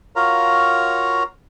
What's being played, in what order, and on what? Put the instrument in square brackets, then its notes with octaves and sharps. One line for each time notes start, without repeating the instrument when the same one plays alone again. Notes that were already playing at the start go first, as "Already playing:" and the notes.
[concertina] F4 F#4 A#4 C#5 F5 A#5